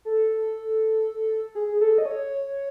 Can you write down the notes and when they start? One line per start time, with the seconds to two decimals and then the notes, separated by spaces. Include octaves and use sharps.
0.05 A4
1.55 G#4
1.81 A4
1.98 D#5
2.06 C#5